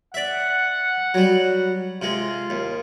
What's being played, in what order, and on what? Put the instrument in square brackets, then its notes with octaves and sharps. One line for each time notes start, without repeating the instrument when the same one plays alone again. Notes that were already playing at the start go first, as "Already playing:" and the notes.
[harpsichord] D5 E5 [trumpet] F#5
[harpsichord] F#3 G3
[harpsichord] C3 G#3 [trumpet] F4
[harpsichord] D#2